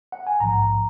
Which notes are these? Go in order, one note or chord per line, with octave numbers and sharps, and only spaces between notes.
F#5
G#5
A#1 G#2 F3 A#5